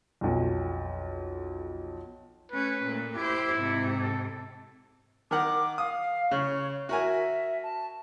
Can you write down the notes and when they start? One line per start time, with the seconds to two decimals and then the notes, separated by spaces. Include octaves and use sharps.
0.21 B1 F2
2.52 A3 C#4 B4
2.83 A#2 A3
3.16 E4 G4 C5
3.55 G#2 C3
4.00 A4
5.31 D#3 A#4 F#5 D6
5.78 F5 D#6
6.31 C#3 C#5
6.89 F#4 A#4 E5 G#5
7.63 A5